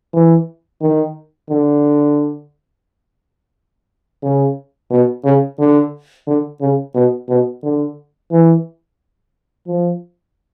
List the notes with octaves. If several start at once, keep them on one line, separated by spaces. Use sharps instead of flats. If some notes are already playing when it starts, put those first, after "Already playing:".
E3
D#3
D3
C#3
B2
C#3
D3
D3
C#3
B2
B2
D3
E3
F3